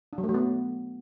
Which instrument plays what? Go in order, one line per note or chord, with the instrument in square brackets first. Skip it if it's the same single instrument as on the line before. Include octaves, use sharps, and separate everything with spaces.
[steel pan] D4
F#3
A3
F#3
B3